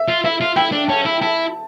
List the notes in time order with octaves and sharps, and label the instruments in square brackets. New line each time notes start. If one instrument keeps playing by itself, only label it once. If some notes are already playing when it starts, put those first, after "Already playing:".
Already playing: [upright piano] E5
[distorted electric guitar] F4
[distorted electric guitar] E4 [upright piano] E5
[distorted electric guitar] F4
[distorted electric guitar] E4 [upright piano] G5
[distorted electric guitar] D4
[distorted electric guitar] C#4 [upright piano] A5
[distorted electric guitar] E4
[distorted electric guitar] E4 [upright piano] A5